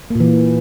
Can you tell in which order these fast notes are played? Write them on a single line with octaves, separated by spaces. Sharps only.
A#3 A#2 E3